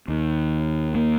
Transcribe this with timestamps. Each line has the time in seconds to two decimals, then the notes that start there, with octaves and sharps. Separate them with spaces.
0.08 D#2
0.95 A#3